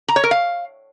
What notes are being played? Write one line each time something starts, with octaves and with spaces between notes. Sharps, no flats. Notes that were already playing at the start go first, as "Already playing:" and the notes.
A#5
C#5
A#4
F5